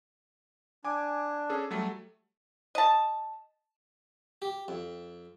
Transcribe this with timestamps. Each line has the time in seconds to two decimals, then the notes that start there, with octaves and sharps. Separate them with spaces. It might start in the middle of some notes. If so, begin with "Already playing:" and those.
0.84 D4 G#5 D6
1.50 C#4 G#4 A4
1.71 F#3 G3 A3
2.75 D#5 A5
4.42 G4
4.68 F2